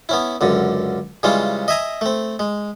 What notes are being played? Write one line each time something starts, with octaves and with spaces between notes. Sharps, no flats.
B3 C#4 E4
C#2 F#2 D3
C#3 E3 G3 G#3 C#4 F4
D#5 E5 G#5 A#5
A3 C4
G#3